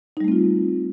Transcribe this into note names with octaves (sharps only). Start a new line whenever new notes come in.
G3 A3 C4 D#4 F4